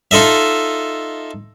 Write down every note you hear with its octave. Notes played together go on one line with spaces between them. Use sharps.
D#4 F4 A4 D#5 E5